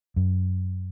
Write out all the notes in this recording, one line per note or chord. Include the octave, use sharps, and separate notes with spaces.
F#2